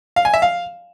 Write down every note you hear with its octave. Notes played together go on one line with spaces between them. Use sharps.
F5
G#5
E5
F5